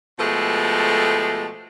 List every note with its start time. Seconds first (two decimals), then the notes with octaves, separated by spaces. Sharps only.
0.19 B2 F3 G#3 A3 G4 A4